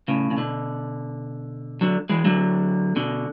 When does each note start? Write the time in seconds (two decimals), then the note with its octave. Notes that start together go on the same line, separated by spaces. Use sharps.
0.08 A2 C#3
0.31 C#3
0.38 B2 D3
1.81 D3 F#3
2.09 E3 G#3
2.25 D3 F#3
2.96 B2 D3